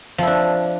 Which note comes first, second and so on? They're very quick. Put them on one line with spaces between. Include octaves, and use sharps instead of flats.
F3 E4 D4